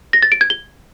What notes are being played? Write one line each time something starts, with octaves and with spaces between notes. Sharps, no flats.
A#6
A6
D7
G#6
G7